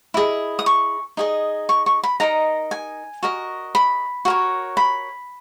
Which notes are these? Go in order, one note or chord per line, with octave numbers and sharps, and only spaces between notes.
E4 G#4 D#5
D#6
C#6
D#4 G#4 D#5
C#6
C#6
B5
D#4 A#4 D#5 A#5
G#5
F#4 A#4 D#5
B5
F#4 A#4 C#5
B5